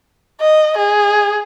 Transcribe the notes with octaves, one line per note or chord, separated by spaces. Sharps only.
D#5
G#4